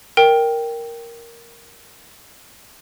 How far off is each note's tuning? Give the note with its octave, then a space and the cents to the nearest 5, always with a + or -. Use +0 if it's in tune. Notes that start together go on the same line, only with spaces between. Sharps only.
A#4 +0 G5 +0